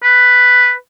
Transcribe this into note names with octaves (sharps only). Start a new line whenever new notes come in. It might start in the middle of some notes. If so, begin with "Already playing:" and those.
B4